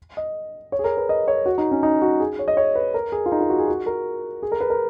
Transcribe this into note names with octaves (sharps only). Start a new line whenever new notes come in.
D#5
C#5
G#4
A#4
B4
D#5
C#5
F#4
D#4
C#4
D#4
F#4
G#4
C#5
D#5
C#5
B4
A#4
G#4
F4
D#4
F4
F#4
G#4
F#4
A#4
G#4
A#4
B4
A#4